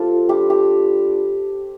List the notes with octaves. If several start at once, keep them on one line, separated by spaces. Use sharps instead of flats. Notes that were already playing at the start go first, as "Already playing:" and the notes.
Already playing: F3 C4 F4 G4 A4
G3 D4 F4 G4
G4